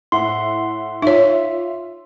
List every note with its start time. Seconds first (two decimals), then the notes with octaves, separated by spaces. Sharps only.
0.12 A2 E5 F#5 C6
1.02 D#4 F4 C#5 E5